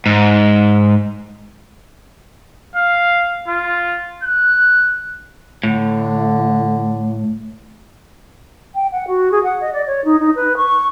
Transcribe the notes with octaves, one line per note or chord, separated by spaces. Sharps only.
G#2
F5
F4
F#6
A2 D3
G5
F#5
F#4
G#4
F#5
D#5
D5
C#5
D#4
D#4
B4
C#6